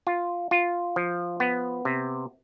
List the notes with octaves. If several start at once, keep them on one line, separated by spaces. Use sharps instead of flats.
F4
F4
F3
B3
C3